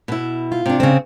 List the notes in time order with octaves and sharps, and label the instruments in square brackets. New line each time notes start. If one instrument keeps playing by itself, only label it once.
[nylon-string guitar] B2 E4
[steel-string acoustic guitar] F4
[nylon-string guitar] C3 D4
[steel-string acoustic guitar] C#3 C4